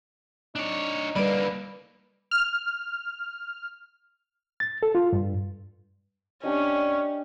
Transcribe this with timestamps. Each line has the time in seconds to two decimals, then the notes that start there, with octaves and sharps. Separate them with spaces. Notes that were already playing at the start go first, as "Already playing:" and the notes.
0.56 D4 D#4 C#5
1.16 D3 G3 A#3 B4 D5 B5 D7
2.31 F6
4.60 A6
4.83 A4
4.95 F4
5.13 G2
6.44 C#4 D4 G4 D#5